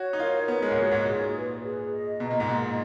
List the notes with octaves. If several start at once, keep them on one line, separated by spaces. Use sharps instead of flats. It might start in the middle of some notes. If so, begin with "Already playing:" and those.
Already playing: F#4 C#5
D#4
F4 A#4
B3 C#5
G#3
G#2
A#2 F#4
G#2
A#2 G#4
B4
G#4
D#5
B2 A#5
A#2
G#2
A#2 D#5